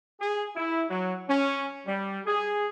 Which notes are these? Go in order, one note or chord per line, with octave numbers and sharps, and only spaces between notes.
G#4
E4
F#3
C#4
G3
G#4